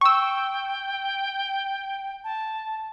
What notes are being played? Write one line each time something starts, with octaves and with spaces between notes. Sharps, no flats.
G5 C#6 E6
A5